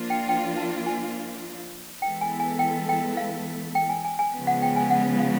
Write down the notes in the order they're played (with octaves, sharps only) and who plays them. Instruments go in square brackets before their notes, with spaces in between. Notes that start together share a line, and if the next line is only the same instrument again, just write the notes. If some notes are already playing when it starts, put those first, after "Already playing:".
Already playing: [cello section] F3 A#3 D4 F4
[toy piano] G5
G5
A5
G#5
[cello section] E3 G#3 B3 E4 A4 [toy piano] G5
[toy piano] G#5
G#5
G5
G5
F5
G5
G#5
G#5
G#5
[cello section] C#3 F3 G#3 B3
[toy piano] F#5
G5
G#5
F#5
F5